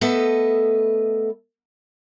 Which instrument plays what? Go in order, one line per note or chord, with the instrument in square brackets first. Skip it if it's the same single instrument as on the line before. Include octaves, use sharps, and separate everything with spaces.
[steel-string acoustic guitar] A3 B3 A4 B4 D#5 E5